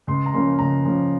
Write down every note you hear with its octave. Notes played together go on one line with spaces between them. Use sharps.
C#2 C6
A#5
C#3 F3 A#3 C#4 C6
C#2 A#5
C#3 F3 A#3 C#4